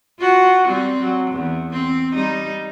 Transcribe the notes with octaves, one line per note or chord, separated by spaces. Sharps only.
F4 F#4
G3 C4
F#3
E2
C4
G3 D#4